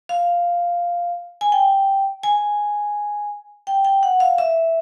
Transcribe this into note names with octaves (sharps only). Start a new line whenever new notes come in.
F5
G#5
G5
G#5
G5
G5
F#5
F5
E5